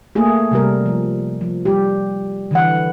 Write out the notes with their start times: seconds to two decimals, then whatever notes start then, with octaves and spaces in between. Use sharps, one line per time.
0.15 A3 A#3 G#4
0.51 C3 G3 A#4
0.86 F3
1.41 F3
1.65 G3 G4
2.51 D3 E3 F#5